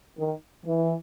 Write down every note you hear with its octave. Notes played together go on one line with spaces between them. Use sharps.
D#3
E3